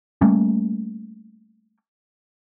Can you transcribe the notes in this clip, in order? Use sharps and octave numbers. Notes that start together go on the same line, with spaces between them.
G3 A3 A#3 C#4